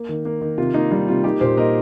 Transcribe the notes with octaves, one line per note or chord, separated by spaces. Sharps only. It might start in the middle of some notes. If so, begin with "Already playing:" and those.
Already playing: A#3
D#3
A#3
D#3
C3 F4
A#3 D#4
G3 D#4
C3 F4
A#3 D#4 G4
A#2 G4 C5
A#3 A#4 D#5